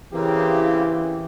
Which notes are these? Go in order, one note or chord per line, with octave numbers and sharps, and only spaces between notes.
C#3 E3 A#3 C4 G4